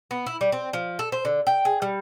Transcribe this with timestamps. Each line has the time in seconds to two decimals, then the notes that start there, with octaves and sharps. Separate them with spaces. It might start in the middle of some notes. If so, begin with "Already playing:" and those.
0.11 B3
0.27 E4
0.41 G3
0.52 C4
0.73 F3
0.99 A4
1.12 C5
1.25 D3
1.47 G5
1.65 G#4
1.82 G3